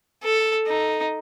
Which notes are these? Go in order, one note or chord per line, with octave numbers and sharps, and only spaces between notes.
A4
D#4